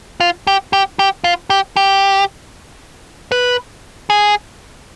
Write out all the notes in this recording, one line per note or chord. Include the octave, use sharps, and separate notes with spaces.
F4
G4
G4
G4
F4
G4
G4
B4
G#4